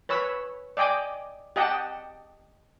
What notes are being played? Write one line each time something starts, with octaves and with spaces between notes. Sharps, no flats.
B4 C#5 B5 E6
D5 D#5 G5 G#5 D6
G4 D#5 F#5 G5 A5